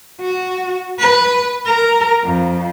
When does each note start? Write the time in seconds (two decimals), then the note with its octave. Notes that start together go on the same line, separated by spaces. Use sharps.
0.21 F#4
0.99 B4
1.66 A#4
2.24 F2